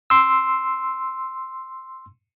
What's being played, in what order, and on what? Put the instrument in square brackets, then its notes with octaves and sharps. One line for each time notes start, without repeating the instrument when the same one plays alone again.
[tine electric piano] C6 E6